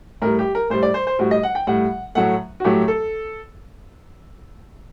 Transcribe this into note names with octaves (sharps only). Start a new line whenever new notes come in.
A2 G3 A#4
G4
A#4
A2 G3 C5
D5
C5
C5
A2 G3 F#4
D#5
F#5
G5
A2 G3 F#5
A2 F#3 A3 F#5
F#4
A2 F#3 A3 G4
A4